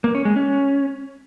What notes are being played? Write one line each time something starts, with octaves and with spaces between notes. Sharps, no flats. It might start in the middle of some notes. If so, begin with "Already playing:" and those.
A#3
C#4
G#3
C#4